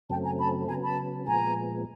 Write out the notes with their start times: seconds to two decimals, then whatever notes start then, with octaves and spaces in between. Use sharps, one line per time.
0.10 F#2 C#3 F#3 A3 C4 G5 A5
0.24 G#5 A#5
0.39 A5 B5
0.68 C#3 F#3 B3 G#5 A#5
0.83 A5 B5
1.26 A#2 F3 G#3 B3 G#5 A#5